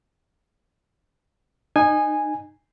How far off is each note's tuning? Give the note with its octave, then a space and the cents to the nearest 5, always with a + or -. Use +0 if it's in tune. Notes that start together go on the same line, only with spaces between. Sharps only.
D#4 -25 G#5 -5